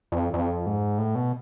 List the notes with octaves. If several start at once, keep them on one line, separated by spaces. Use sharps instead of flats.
F2
F2
G#2
A2
B2